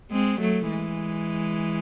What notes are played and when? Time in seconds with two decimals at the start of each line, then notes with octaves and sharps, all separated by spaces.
0.11 G#3 C4
0.40 F#3 A3
0.70 E3 G#3